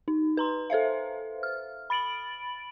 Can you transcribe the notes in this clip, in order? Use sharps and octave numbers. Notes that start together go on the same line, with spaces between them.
D#4
B4 A#5 C6
A4 C5 E5 F5
F6
B5 A6 D7 F#7